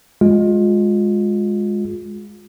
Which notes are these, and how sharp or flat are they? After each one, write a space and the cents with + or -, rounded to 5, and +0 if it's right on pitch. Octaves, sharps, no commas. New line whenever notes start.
G#3 +0 F4 +30